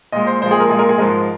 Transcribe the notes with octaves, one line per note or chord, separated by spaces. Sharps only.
A#2 G#3 D#5
C5
A#2 F3 G#3 C5
G#4
A#4
A#2 G#3 G#4
A#4
G#4
G#2 F3 G#3 A#4